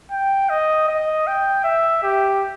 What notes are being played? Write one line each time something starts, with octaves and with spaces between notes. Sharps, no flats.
G5
D#5
D#5
G5
E5
G4